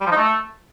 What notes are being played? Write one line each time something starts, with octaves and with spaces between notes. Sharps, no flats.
G3
F3
D#4
A3